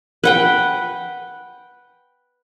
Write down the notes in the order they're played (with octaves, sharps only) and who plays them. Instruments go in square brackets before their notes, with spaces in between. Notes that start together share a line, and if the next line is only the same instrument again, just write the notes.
[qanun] B4 F#5 G5